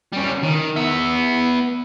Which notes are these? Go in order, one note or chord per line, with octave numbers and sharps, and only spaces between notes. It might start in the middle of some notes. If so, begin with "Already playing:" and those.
G3 C#4
D#3
B3 E5